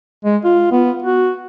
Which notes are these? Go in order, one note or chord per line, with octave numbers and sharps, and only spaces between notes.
G#3
F4
B3
F#4